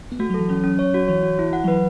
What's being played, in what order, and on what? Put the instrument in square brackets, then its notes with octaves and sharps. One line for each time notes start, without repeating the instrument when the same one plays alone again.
[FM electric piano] B3
[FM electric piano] A3 [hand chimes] F#4
[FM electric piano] F#3
[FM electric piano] E3 [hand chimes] A4
[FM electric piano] F#3 [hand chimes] C#4
[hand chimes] C#4
C#5
F#4
[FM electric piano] E3 [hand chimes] C#5
[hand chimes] F#4
E4
F#5
[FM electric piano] F#3
[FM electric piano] E3 [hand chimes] B4